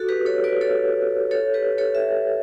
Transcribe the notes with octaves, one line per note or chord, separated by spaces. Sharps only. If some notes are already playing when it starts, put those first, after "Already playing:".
Already playing: F#4 A4
G4 B4
A4 C#5
B4 D5
A4 C#5
A4 C#5
G4 B4
A4 C#5
E5